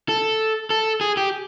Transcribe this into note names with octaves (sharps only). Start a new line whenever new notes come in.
A4
A4
G#4
G4